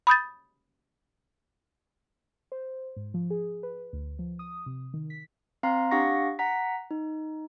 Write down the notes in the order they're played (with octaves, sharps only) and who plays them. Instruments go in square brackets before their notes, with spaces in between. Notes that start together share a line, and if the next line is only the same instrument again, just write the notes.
[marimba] B5 D#6 G6 A6
[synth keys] C5
G#2
F3
G#4
B4
D2
F3
D#6
C3
D#3
B6
[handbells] C4 F5 A#5 C6 C7
D4 G4 F5 F#5 C#6 A#6
F#5 A#5 B6
D#4